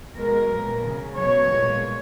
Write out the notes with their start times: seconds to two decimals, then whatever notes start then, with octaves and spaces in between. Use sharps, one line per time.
0.17 B2 G#3 A#4
0.51 A#2 F#3
0.84 C#3 F#3
1.17 B2 F#3 C#5
1.50 A#2 G#3